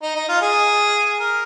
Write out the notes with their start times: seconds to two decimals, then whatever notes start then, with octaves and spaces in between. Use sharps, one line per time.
0.02 D#4
0.15 D#4
0.29 F4
0.42 G#4
1.19 A#4